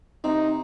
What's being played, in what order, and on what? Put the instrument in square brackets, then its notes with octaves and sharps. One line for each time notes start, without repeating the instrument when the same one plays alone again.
[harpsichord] C3 C4 [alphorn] D#4